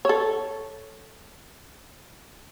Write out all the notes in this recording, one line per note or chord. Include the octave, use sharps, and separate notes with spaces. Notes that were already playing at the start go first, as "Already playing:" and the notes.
A4 C#5